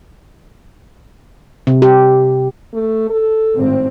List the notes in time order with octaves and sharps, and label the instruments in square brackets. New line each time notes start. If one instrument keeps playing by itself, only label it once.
[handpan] C3
G4
[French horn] A3
A4
[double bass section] G#1 A2 C4